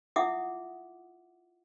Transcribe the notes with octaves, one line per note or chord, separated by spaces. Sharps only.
E4 F4 E5 F#5 D6 D#6